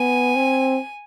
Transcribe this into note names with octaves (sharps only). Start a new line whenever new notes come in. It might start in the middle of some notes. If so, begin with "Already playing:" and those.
Already playing: B3 G#5
C4